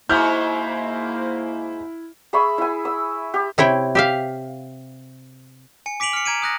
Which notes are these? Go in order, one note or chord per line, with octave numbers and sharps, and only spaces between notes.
G#2 A#3 E4 F#4 C5 F6 G6
G#4 E5 B5 C#6
E4 G#5
E6
G4
C3 E4 C#5 G5
G4 E5 F5
G#5 C#7
D6 B6 D7 F7 F#7
F6 C#7
A#5 G#6 D7 D#7
D#6 F#6 A#6